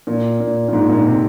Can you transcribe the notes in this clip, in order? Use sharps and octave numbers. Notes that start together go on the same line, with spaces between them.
A#2
A#2
A#2
G#2
A#2
A#2
C3